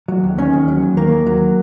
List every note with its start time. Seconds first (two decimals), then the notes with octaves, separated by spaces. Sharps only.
0.08 F#3
0.24 D#2
0.38 D#3 C#4
0.53 D#2
0.68 F#3
0.82 D#2
0.97 D#3 A#3
1.12 D#2
1.26 F#3